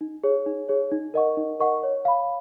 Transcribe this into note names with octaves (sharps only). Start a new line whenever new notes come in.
D#4
G#4 C#5
D#4
G#4 C#5
D#4
A#4 D#5 F#5 C#6
D#4
A#4 D#5 F#5 C#6
C#5
F5 B5